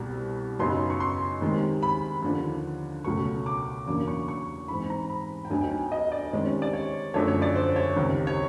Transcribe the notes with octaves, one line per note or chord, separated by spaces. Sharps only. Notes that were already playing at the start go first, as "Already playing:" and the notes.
Already playing: C2 B2 G3
F#2 C#3 F#3 B3 D#4 C6
C#6
C6
C3 D#3 G#3
B5
D#2 D3 F3
C#2 B2 F#3 A3 C#6
D6
E2 C#3 F#3 A#3 D4 D6
C#6
C#6
G#2 E3 G#3 C4 B5
A#5
B5
G5
D2 D3 F#3 B3 D#4 G#5
G5
G#5
D#5
D5
C3 D#3 G#3 C#4
D5
C#5
F#2 D3 F3 A3 D4 C#5
C#5
D5
C5
C#5
C#2 C3 D#3
C#5